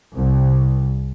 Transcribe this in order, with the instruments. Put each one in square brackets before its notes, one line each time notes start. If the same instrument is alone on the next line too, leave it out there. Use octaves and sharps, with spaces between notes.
[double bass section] C2